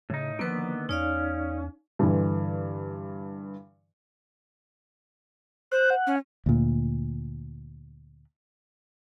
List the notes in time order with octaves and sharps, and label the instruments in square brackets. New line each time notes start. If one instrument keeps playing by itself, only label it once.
[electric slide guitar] A2 D#4 [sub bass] C#3
[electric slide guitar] D3 D#3 B3 [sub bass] F3 [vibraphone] A#3 B4
[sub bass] E2 [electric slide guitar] C#4 [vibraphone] D#4 D5 F5
[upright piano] G2 D3 E3
[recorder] C5 [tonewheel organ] F#6
[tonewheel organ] F#5
[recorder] C#4
[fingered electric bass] D2 A#2